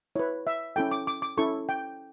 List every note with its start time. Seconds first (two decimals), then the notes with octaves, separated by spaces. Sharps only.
0.16 E4 B4 C#5
0.47 E5
0.76 C#4 E4 A4 G5
0.91 D6
1.07 D6
1.22 D6
1.37 C#4 E4 A4 C#6
1.69 G5